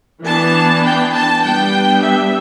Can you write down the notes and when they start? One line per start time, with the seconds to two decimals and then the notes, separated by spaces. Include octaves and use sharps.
0.25 E3 B3 D4 A5
0.84 G5
1.13 A5
1.43 G3 B3 D4 G5
2.02 E5